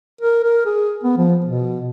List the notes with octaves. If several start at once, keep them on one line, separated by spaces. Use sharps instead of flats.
A#4
A#4
G#4
B3
F3
B2